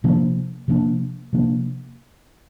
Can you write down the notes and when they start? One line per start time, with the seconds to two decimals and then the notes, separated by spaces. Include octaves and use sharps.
0.04 C3 F3 A#3 D4
0.68 C3 F3 A#3 D4
1.33 C3 F3 A#3 D4